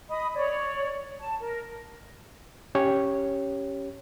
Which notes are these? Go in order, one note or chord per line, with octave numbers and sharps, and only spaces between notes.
D#5 B5 D#6
C#5 D5
A5
A#4
C#4 G4 C#5